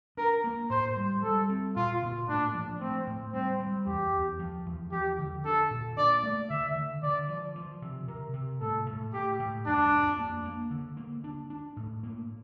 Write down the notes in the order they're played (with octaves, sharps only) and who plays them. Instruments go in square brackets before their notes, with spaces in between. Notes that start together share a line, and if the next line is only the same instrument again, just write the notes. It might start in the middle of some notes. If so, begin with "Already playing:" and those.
[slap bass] D4 [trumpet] A#4
[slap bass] A#3
[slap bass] A2 [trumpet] C5
[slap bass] G3
[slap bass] G3 [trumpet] A4
[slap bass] C4
[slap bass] A#2 [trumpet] F4
[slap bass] A#2
[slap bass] A2 [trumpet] D4
[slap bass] F3
[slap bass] A3 [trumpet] C4
[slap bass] A2
[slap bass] G3 [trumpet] C4
[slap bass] G3
[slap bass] E2 [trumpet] G4
[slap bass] E2
F3
E2
[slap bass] F3 [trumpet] G4
[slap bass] D3
[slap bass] D4 [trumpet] A4
[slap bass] A#2
[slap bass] D4 [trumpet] D5
[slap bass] A3
[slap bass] D3 [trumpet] E5
[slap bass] D3
[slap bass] D3 [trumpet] D5
[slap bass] F3
F3
C3
[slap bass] C3 [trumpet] A#4
[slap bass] C3
[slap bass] A2 [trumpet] A4
[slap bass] A2
[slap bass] A2 [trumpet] G4
[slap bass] A2
[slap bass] F2 [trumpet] D4
[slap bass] F2
A#3
A#3
D3
A#3
D4
D4
A2
A#3